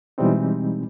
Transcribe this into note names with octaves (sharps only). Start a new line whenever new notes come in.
B2 E3 G3 G#3 C4 D#4